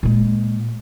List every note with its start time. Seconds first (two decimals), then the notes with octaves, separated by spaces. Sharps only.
0.03 A#2 G#3